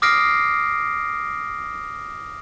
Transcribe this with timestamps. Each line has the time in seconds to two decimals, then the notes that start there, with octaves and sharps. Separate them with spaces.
0.02 D6 D#6 F6 A#6 C7 D7